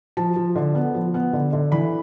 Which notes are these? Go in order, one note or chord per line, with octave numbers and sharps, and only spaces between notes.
F3 A5
F3
D3
B3
F3
B3
D3
D3
E3 B5